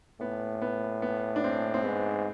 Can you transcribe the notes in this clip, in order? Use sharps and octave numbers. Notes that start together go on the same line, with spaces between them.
A2 B3
B3
B3
D4
C4
C4
G#2 B3